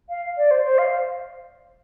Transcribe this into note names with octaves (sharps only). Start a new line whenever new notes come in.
F5
D5
C5
C5
F5